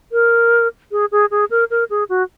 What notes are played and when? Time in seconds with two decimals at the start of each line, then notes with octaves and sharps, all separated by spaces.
0.12 A#4
0.92 G#4
1.12 G#4
1.31 G#4
1.51 A#4
1.70 A#4
1.90 G#4
2.09 F#4